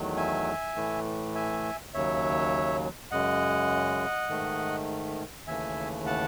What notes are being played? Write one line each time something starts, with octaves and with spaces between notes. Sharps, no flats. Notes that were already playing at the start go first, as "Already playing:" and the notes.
Already playing: E2 D#3 F#3 A3
E5 G#5
A2 E3 A3
E5 G#5
D#2 C#3 F#3 C#5 E5
F#2 C#3 G#3 D#5 F#5
G#2 D#3 A3
D#2 C#3 E3 A3 E5 G#5
F#5 A5